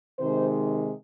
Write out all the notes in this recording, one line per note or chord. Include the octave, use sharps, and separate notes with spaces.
C3 D#3 G#3 C5